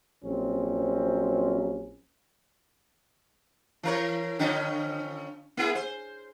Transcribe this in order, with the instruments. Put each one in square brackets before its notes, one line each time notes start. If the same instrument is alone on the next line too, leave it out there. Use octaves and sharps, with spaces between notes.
[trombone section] A#1 F#3 C4 C#4
[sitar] E3 A#4 C#5
D3 F3 C#4
A#3 E4 G#4
C5